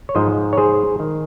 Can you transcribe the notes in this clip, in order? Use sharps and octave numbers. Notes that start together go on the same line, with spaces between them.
C#5
G#2 F3 C5 D#5
C#5
G#4 C5
D#3